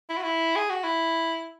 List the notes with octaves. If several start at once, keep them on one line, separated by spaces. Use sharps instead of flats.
E4
F#4
E4
G#4
F#4
E4